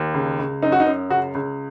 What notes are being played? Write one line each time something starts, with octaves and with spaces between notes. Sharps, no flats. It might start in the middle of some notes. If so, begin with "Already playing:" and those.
Already playing: D#2
C#2
C#2
F#2 D#4
F#4
D#4
F#2
C#2 F#4
C#2